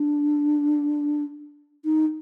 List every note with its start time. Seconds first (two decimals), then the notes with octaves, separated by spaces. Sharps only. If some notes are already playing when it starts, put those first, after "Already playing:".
Already playing: D4
1.85 D#4